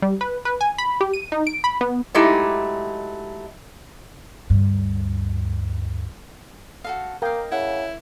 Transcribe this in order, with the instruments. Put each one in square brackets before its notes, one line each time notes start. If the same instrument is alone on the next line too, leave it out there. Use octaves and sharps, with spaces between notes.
[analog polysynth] G3
B4
B4
G#5
B5
G4
D#7
D#4
D7
B5
B3
[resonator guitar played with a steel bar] F#3 G#3 A3 D#4 E4 G4
[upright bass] D2 G2
[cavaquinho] F#4 A4 F5
[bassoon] A#3 [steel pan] A#4 G5 [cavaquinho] D#5 F5
[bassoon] C#3 [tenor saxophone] E4 [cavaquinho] F#5